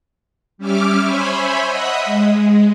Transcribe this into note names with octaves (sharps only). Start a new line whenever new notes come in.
G3 C#4 E5 D6 F6
C5 C#5 E5 G#5 B5
D#5 E5 F#5 B5 D#6
G#3